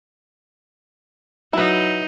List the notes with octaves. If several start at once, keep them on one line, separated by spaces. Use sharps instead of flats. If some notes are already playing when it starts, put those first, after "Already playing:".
F#3 D#4 E4 B4